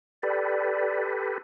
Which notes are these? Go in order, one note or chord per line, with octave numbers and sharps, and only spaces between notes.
G4 A4 B4 D5